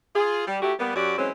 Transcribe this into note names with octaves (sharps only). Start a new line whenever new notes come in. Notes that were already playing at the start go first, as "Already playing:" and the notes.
F4 G#4
G3
A3 E4 F#4 G4
G3 A#3 B3
F#2 F#3 F#4 G4 D5
E3 F#3 G#3 C4 C#4